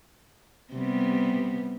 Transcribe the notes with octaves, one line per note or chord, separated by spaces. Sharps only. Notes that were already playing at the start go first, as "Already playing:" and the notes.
C3 G3 B3